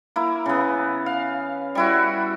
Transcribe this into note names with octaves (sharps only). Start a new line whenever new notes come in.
A#3 E4
C#3 B3
F5
G3 E4 F#4